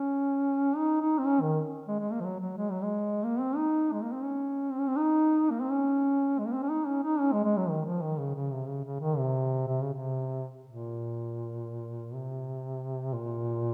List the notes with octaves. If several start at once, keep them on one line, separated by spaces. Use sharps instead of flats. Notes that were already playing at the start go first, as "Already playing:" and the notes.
Already playing: C#4
D#4
D#4
C4
C#4
D#3
G#3
G#3
A#3
F3
F#3
F#3
G#3
F#3
G#3
A#3
C4
D#4
G#3
A#3
C4
C#4
C4
C#4
C4
D#4
A#3
C4
C#4
G#3
A#3
C4
C#4
D#4
C#4
D#4
C#4
G#3
G#3
F#3
D#3
F3
D#3
C#3
C#3
C3
C#3
C#3
D#3
C3
C3
C#3
C3
A#2
C3
A#2